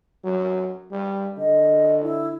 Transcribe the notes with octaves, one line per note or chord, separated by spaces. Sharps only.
F#3
G3
D3 D#5
E4